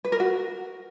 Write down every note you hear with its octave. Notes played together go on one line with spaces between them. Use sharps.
B4
A#4
F#4